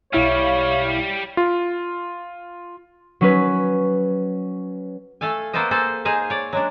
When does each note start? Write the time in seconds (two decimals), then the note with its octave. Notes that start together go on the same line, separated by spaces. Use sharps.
0.13 B1 G3 E4 C#5 F5
1.37 F4
3.21 F#3 C#4 B4
5.21 A3 A4 F5 G#5
5.53 A#3 B3 A4 A#4 C5 D#5
5.71 A#3 G#4 A4 C5
6.05 D#4 G#4 C5 F5
6.30 C#5 D5
6.53 F#3 G#3 D4